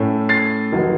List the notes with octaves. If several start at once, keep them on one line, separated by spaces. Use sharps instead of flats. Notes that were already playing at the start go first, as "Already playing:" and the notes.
Already playing: A2 A3 C#4
A6 C7
F1 D#3 F#3